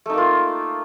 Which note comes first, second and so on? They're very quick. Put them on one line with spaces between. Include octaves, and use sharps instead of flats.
A3 D#4 A#3 F4